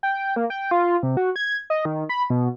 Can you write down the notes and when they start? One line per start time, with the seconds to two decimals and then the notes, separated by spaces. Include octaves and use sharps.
0.03 G5
0.36 A#3
0.50 G5
0.71 F4
1.03 C3
1.17 F#4
1.36 G#6
1.70 D#5
1.85 D#3
2.09 B5
2.30 B2